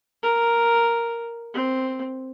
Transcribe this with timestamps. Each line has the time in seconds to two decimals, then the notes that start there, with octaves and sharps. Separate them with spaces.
0.23 A#4
1.54 C4